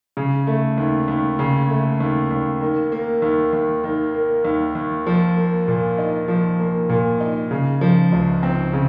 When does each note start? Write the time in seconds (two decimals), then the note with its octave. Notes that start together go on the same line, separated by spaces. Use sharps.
0.17 C#3
0.47 A3
0.78 D#2
1.08 D#2
1.39 C#3
1.70 A3
2.00 D#2
2.31 D#2
2.61 D#3
2.92 A#3
3.22 D#2
3.53 D#2
3.84 D#3
4.14 A#3
4.45 D#2
4.75 D#2
5.06 F3
5.37 A#3
5.68 A#2
5.98 D#4
6.28 F3
6.60 A#3
6.89 A#2
7.20 D#4
7.51 C#3
7.81 F3
8.12 C#2
8.43 C4
8.73 C#3